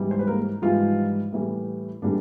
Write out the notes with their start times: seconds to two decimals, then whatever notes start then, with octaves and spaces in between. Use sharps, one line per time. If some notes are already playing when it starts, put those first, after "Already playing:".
Already playing: G#2 E3 G3
0.11 C5
0.19 B4
0.27 A#3 A#4
0.62 G#2 E3 F3 G3 F4
1.32 A2 E3 G3
2.02 A2 D3 E3 G3 D4